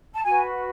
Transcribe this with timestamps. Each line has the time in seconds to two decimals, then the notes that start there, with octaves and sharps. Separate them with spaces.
0.13 A5
0.24 F#4 B4 G#5